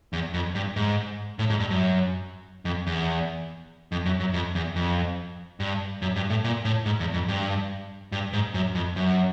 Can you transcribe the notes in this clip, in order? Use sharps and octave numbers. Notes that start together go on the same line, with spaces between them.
E2
F2
G2
G#2
A2
G#2
G2
F#2
F2
E2
F2
F#2
F#2
F2
E2
F2
G2
F#2
G2
A2
A#2
A2
G#2
E2
F2
G2
G2
G#2
F#2
F2
F#2